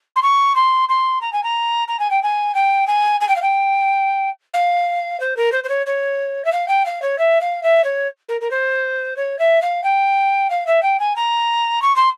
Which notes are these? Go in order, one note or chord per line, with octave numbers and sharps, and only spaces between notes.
C6
C#6
C6
C6
A#5
G#5
A#5
A#5
G#5
G5
G#5
G5
G#5
G#5
G5
F5
G5
F5
C5
A#4
C5
C5
C#5
C#5
E5
F5
G5
F5
C#5
E5
F5
E5
C#5
A#4
A#4
C5
C#5
E5
F5
G5
F5
E5
G5
G#5
A#5
C#6
C6